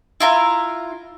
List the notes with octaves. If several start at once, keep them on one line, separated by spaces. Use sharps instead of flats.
E4 F4 A#5